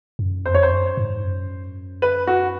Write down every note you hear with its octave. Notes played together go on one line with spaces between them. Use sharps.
F#2
F2 C5
C#5
C5
F#2
G#2
F#2
B4
F#4